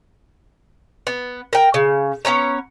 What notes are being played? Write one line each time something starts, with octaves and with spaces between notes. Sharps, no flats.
B3
A#4 G5
C#3
B3 C#4 C#5 A#5